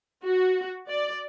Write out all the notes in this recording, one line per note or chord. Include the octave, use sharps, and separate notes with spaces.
F#4
D5